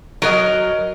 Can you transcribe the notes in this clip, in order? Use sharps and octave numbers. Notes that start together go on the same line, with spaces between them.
F#3 A#4 D#5